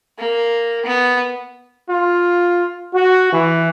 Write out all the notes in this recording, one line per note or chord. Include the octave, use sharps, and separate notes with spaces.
A#3
B3
F4
F#4
E3